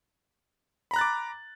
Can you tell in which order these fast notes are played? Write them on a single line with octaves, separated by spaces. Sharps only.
B5 A#5 F#6 A6 D6